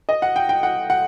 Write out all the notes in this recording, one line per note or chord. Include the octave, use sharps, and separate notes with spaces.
D#5
F#5
G5
G5
F#5
F#5